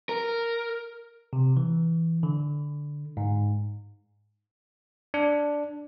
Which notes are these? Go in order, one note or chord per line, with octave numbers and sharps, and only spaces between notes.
A#4
C3
E3
D3
G#2
D4